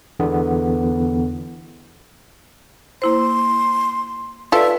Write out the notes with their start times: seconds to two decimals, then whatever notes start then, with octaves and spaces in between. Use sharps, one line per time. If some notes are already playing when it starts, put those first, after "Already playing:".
0.19 E2 D3 E3 B3
3.02 A#3 E4 C5 C6
4.52 F4 A4 B4 D5 E5